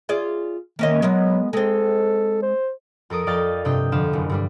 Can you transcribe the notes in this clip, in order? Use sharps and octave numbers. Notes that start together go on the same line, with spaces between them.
F4 G#4 D5
D#3 A#3 C#4 D#5
F#3 G#3 B3 A#4
G#3 C4 A4
C5
F2 A4 A#4 D#6 D7
F2 D5 D#5 F5 G5 A6
G2 C3 D4 D#5 G5 G6
F2 D3 D4 F4 E7
F#1
G2 G3 D4